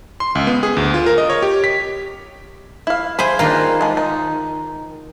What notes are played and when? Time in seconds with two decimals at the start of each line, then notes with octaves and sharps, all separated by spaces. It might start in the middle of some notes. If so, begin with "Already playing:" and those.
0.20 C6
0.35 C#2
0.47 B3
0.63 G#4
0.77 D2
0.94 F4
1.06 A#4
1.18 D#5
1.30 C#5
1.42 G4
1.64 B6
2.87 E4 F5
3.19 G#4 C5 G#5 B5
3.39 D#3 A#3 D4 F4
3.81 F3 G#3
3.97 D#4